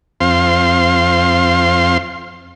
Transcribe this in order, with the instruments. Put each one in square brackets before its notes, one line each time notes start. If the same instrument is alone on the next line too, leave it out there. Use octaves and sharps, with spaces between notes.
[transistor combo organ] F2 C4 F5 C6